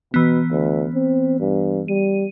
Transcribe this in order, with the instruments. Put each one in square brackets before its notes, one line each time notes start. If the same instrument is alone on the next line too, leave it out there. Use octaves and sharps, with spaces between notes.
[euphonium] B2 [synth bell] E3 B3
[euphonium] D2
C4
G2
[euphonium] G3 [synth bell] D#7